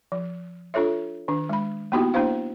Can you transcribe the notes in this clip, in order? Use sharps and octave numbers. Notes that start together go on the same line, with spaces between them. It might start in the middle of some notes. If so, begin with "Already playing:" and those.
F3
D4 F4 A4 C#5 E5
D#3 D4
G#3 B5
A#3 B3 D#4 E4 F#4 G4
A#3 D4 E4 C5 F5